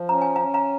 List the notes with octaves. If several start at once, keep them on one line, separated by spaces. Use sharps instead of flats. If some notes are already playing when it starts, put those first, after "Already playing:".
Already playing: F3
C#4 A#5
G#5
C#4 F5 A#5
F5 A#5